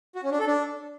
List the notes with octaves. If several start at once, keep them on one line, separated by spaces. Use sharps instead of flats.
F#4
C#4
D4
A4
D4